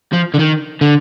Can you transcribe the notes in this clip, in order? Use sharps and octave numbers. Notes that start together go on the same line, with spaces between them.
F3
D3
D#3
D3